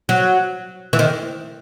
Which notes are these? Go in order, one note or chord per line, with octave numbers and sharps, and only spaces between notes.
F#3
E3
D#3